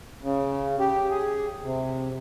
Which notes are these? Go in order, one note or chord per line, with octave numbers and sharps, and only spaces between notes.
C#3
G4
G#4
C3